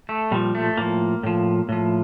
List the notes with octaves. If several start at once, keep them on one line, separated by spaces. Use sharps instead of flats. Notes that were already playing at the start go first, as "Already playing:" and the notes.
A3
A#2 F3 G3
A3
A2 F3 A#3
A2 F3
A2 F3